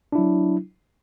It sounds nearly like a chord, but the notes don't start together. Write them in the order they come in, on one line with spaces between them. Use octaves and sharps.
D4 E4 F#3